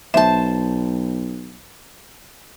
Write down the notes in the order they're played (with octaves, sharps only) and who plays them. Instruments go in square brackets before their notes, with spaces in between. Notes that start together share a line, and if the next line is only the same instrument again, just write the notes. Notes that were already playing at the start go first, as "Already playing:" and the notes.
[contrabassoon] B1 [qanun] C5 A5 [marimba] E5